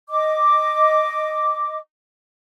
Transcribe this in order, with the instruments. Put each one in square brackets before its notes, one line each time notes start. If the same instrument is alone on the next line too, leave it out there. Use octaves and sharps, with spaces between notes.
[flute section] D#5 D6